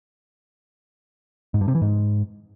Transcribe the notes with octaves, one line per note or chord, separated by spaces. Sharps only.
G#2
G2
C3
E3
G#2